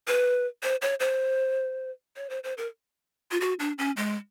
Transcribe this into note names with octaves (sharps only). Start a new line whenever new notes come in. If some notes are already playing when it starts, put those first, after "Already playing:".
B4
C5
C#5
C5
C#5
C5
C5
A#4
F4
F#4
D4
C#4
G#3